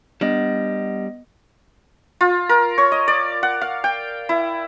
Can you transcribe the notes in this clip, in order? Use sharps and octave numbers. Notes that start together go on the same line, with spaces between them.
G3 B3 D4 D#5
F4
A#4
C#5
D#5
D5
F#5
F5
G5
E4